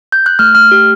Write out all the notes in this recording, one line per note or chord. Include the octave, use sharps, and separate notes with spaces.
G6
F#6
A3 F6
A3 F6
G4